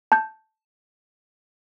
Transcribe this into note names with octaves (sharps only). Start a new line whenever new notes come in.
A5 G6